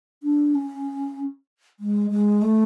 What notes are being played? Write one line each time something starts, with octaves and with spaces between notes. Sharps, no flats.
D4
C#4
G#3
G#3
A3